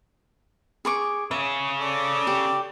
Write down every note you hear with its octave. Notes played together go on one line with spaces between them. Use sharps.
G#4 C#6 D6
C#3 C#4 E5
A4 D5
G4